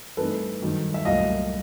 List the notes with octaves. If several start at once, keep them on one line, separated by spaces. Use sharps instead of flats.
G2 E3 A3 C4 D#4 A4 B4
G2 D#3 F#3
E5
C2 A#2 F#3 A3 D#5 F5